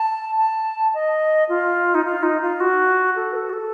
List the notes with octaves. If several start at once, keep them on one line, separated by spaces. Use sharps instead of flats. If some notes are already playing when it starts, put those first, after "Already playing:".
Already playing: A5
A5
D#5
F4
D#4
F4
D#4
F4
F#4
A4
B4
A4
F#4
A4